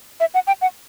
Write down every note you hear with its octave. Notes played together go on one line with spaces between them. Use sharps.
E5
F#5
G5
F#5